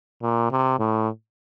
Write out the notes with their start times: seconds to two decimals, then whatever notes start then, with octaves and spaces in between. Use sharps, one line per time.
0.22 A#2
0.51 C3
0.79 A2